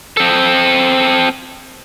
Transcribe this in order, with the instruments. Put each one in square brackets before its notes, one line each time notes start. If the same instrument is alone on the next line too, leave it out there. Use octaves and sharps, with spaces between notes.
[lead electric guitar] C4 A4